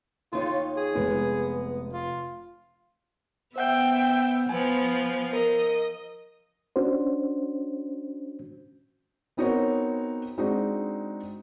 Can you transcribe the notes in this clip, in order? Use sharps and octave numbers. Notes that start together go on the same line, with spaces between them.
D#2 D#4 F4 C#5
G#4
F1 G#3 B3
F4
B3 C5 E5 F#5 G5 G6
F3 B3 G#5
A#4 D#5
C#4 D4 F#4 C5
B3 C4 D#4 F#4 A#4 C#5
G#3 C4 D4 D#4 F#4